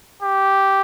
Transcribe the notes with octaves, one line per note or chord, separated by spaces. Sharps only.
G4